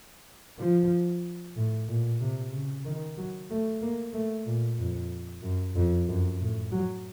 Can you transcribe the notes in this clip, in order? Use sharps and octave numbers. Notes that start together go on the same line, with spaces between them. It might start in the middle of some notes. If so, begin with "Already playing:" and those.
F3
A2
A#2
C3
C#3
D#3
F#3
A3
A#3
A3
A#2
F2
F#2
F2
F#2
A2
F#3